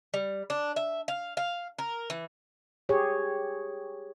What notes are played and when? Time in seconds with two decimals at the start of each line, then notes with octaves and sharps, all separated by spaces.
0.14 G3
0.50 D4
0.76 E5
1.08 F5
1.37 F5
1.79 A#4
2.10 E3
2.89 G4 G#4 C#5